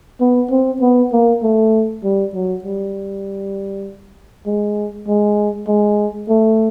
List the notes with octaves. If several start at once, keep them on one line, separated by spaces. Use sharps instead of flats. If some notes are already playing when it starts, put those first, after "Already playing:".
B3
C4
B3
A#3
A3
G3
F#3
G3
G#3
G#3
G#3
A3